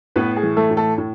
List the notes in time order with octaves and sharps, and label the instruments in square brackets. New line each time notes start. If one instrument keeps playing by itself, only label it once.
[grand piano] A2 B3 B4
G#4
E3
A3 A4
A2
A3 A4
A2